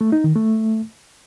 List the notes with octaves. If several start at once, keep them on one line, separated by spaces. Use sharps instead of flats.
A3
D#4
D#3
A3